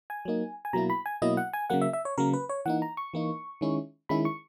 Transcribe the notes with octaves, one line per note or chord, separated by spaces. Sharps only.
G#5
F#3 A#3 D#4
G#5
B2 F#3 A#3 E4 A#5
B5
G#5
B2 F#3 A#3 E4 D#5
F#5
G#5
C#3 F#3 A#3 F#5
E5
E5
C#5
C#3 F#3 A#3 A#4
B4
C#5
E3 A#3 D#4 F#5
A#5
C#6
E3 A#3 D#4
D#3 G#3 C#4 E4
D#3 G#3 C#4 E4 B5
C#6